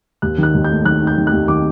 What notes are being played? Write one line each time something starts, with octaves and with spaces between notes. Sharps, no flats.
D#2 F#6
D#3 F#6
D#2
A3 G6
D#3 F#6
D#4
G6
D#3
F#6
D#2
D#3 D6